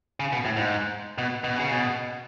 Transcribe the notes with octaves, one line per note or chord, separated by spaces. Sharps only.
C#3
B2
A2
G#2
B2
B2
C#3
B2